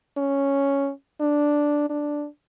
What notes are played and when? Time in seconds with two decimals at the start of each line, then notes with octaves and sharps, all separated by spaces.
0.17 C#4
1.20 D4
1.90 D4